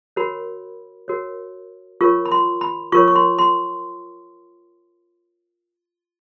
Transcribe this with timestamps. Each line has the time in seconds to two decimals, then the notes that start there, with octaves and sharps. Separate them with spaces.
0.16 F#4 A#4 C#5 B5
1.08 F#4 A#4 C#5
2.01 F4 A#4 C#5 C#6
2.25 B5
2.32 C6
2.61 B5
2.92 F4 A#4 C#5 C#6
3.08 C#6
3.15 C6
3.39 C6